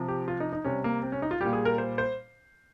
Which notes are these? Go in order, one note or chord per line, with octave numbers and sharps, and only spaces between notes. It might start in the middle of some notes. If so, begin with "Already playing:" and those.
Already playing: C3 F3
G4
F4
D#4
D#4
C3 G3 C#4
A#3
C4
C#4
D#4
F4
A#2 G3 G4
G#4
A#4
C5
C5